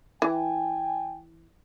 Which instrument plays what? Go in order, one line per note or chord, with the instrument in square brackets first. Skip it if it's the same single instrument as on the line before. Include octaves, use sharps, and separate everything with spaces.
[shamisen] E3 [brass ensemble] G5 G#5